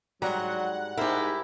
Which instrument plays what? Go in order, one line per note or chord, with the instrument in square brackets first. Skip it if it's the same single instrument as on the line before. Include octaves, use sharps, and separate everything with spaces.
[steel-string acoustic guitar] G#2 A#5 [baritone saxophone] F#3 [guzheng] G3 [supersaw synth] F#5
[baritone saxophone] G#2 [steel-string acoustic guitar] E4 G4 [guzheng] A#4 C5